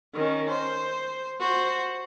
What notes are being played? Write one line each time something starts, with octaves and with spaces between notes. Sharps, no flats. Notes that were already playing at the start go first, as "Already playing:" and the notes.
D#3 C#4
C5
F#4 C5